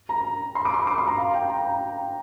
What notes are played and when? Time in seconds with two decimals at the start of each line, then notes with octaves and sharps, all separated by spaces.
0.09 A#5
0.55 C6
0.65 D6
0.74 C6
0.87 D6
0.98 C6
1.07 A#5
1.18 F5
1.34 G5
1.49 A#5
1.65 A#5